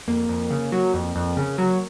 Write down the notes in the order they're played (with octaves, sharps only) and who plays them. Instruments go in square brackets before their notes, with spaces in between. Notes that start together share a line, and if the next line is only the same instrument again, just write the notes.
[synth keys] F2 A#3
F2
C#3
F#3
F2
F2
C#3
F#3